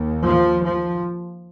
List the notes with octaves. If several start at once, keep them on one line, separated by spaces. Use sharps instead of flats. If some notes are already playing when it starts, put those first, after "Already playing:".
Already playing: D#2
F3
F3